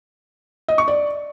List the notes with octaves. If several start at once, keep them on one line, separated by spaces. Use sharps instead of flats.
D#5
C#6
D5